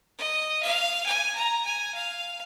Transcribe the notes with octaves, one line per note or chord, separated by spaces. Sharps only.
D#5
F5
G#5
A#5
G#5
F5